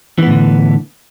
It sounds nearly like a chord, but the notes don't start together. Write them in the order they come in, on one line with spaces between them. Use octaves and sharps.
E3 B3 A2 D3